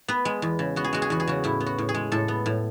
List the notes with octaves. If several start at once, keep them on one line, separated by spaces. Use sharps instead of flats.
B3 B4
G#3
E2
C#3
B3 F#4
G#4
G#3 F#4
G#4
E2 F#4
G#4
C#3 F#4
A2 E4
B3
F#4
A2
G#4
G#3
A2 A4
B3
A2